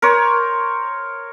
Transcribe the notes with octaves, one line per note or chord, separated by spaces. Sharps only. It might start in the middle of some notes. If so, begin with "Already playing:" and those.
A#4 C5 C#5